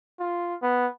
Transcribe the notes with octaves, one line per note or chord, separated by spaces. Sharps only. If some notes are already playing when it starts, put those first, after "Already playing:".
F4
B3